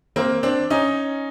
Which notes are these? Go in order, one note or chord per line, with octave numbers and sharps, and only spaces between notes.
A#3 C4
C4 D4
C#4 D#4